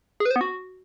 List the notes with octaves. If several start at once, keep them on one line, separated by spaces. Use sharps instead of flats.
G#4
B4
C5
B3
F#4